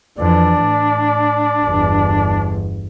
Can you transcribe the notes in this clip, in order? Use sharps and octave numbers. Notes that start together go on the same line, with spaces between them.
F2 E3 D4 D5
A2
G1 E2